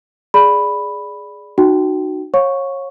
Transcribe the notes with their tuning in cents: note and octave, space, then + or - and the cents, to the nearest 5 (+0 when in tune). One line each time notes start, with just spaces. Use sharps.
G#4 +0 D5 +0 B5 +0
D#4 -35 F#4 +0 G5 -20
C#5 -25 F5 +35 C#6 +0